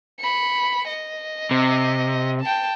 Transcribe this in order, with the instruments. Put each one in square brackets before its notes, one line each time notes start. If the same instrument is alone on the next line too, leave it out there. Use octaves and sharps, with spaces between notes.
[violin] B5 C#7
D#5
[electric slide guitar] C3
[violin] G5 A5